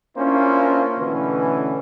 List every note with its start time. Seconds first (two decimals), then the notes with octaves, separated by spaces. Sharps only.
0.17 A#3 C#4 D4 E4 F4 C5
0.98 B2 D3 E3 A3 C#4 B4